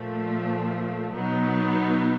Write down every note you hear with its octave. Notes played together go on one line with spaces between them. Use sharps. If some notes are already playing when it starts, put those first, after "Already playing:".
Already playing: A#2 F3 A3
B2 F#3 B3 D#4